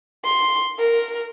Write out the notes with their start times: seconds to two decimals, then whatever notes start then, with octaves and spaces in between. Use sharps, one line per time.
0.25 C6
0.79 A#4